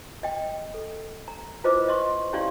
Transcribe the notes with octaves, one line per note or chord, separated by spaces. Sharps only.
D#5 G5
A4
A#5
E4 F4 B4 C5 D#5 D6
D#5 C6 C#6
C#4 E4 G4 D5 F5 C6